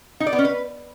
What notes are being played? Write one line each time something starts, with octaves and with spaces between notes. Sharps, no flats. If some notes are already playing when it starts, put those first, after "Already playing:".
D#4
D5
B3
C#4
B4